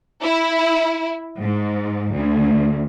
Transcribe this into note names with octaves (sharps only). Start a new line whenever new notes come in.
E4
G#2
D2